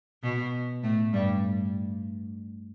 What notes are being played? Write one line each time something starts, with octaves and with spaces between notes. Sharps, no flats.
B2 B3
A2 A3
G2 G3